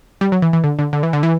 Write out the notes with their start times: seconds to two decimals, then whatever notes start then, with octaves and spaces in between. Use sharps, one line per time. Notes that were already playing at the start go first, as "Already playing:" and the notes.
0.21 G3
0.32 F#3
0.42 E3
0.53 E3
0.64 D3
0.79 D3
0.93 D3
1.03 E3
1.13 D3
1.23 E3